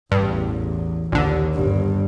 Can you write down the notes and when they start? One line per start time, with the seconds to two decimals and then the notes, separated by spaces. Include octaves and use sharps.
0.12 A1 E2 G2
1.12 A#1 D#2 D3
1.53 G1 G2